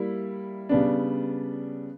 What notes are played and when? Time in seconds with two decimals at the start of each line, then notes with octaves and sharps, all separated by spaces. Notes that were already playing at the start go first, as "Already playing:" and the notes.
Already playing: G3 A#3 E4
0.69 C#3 G3 B3 D4